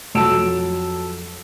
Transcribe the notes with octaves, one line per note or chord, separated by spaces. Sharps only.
F2 F#3 A5 E6 D7 E7